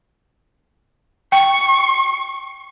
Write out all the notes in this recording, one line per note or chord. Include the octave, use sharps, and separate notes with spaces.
G5 C#6